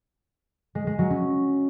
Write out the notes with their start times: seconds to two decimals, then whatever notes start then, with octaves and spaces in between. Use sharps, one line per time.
0.75 G#3
0.87 G#3
0.99 F#3
1.10 C#4